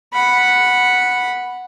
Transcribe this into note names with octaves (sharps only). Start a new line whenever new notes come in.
F#5 B5